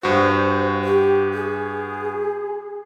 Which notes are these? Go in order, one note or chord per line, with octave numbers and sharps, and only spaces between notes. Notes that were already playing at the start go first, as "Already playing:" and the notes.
G2 F#4 C5
G4
G#4